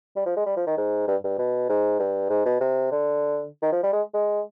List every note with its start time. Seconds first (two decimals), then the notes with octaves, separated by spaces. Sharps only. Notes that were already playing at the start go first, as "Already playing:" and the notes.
0.16 G3
0.26 F3
0.37 G#3
0.46 G3
0.57 F3
0.67 D#3
0.77 G#2
1.08 G2
1.24 G2
1.39 B2
1.69 G#2
2.00 G2
2.29 G#2
2.46 B2
2.60 C3
2.92 D3
3.62 D#3
3.72 F3
3.83 G3
3.93 G#3
4.14 G#3